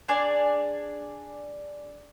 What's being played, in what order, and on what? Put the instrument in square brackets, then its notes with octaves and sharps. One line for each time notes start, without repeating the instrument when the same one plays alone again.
[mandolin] D4 G#4 D5